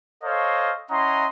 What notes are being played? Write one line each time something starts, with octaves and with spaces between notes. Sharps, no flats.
A4 C5 C#5 D#5 F5
C#4 E4 D#5 F#5 A#5 C6